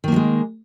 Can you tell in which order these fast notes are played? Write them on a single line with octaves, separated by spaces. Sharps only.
D#3 A#3 F3 G#3